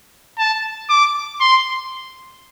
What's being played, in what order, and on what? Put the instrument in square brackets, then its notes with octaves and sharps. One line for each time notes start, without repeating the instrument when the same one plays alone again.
[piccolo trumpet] A5
D6
C6